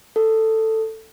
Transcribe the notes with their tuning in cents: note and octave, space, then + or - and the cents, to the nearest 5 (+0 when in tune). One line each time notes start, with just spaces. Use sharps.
A4 +10